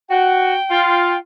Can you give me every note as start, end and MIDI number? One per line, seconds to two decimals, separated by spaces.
0.09 0.54 66
0.09 1.18 79
0.70 1.13 65